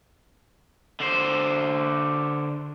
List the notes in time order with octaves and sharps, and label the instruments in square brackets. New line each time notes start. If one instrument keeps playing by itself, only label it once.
[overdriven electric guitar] D3 C5